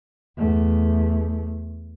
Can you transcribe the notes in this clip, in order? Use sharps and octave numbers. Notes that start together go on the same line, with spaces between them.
E2 A3